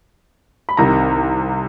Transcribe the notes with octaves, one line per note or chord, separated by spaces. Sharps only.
B5
C2 C3 D#3 A#5